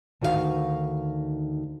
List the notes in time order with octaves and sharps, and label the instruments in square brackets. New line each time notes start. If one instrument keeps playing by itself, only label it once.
[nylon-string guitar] D2 D#3 F#4 G4 F5